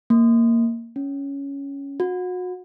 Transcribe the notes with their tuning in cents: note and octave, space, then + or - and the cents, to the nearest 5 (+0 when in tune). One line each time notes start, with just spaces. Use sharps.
A#3 -10
C#4 +10
F#4 -30